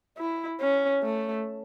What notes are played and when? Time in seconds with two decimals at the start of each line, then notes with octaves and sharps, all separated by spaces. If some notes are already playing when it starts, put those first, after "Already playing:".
0.18 E4
0.60 C#4
1.03 A3